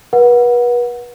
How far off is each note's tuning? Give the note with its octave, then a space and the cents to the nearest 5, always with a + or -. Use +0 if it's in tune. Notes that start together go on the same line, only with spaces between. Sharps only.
B4 -35 F#5 -15